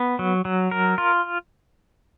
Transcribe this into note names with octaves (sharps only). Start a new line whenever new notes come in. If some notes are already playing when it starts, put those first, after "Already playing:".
Already playing: B3
F#3
F#3
A#4
F4